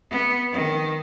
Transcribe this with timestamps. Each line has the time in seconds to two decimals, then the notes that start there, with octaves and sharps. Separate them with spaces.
0.11 B3
0.51 D#3